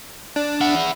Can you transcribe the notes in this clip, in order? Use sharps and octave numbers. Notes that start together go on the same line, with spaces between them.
D4
E4 F#5